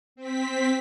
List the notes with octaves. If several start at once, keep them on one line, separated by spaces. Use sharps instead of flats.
C4 B6